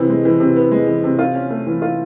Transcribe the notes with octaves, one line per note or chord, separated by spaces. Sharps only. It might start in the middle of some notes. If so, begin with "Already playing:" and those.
Already playing: C3 E3 B3
G#3
E3
C3
B3
G#3
E3
C3
F4
C#4
A3
E3
F4